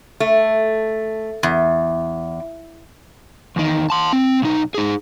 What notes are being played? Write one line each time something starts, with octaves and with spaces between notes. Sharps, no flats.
A3
E2
E2 D#3
A5 C6
C4
B1 D#4
D#4 G#4